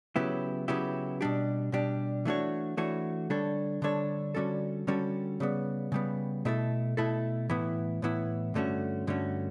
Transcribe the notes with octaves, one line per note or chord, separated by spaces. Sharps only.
C#3 F#3 B3 E4 G4
C#3 F#3 B3 E4 G4
B2 G3 D4 G4
B2 G3 D4 G4
E3 A3 D4 F#4 C#5
E3 A3 D4 F#4 C#5
D3 G3 D4 A4 C#5
D3 G3 D4 A4 C#5
D3 G3 C#4 F#4 A4
D3 G3 C#4 F#4 A4
C#3 G3 B3
C#3 G3 B3
B2 A3 E4 A4
B2 A3 E4 A4
A2 E3 B3 E4
A2 E3 B3 E4
G2 D3 A3 C#4 F#4
G2 D3 A3 C#4 F#4